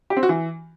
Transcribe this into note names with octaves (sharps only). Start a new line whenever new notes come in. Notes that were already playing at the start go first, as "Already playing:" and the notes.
G4
C4
F#4
E3